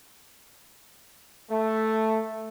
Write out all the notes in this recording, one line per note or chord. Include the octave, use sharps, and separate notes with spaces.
A3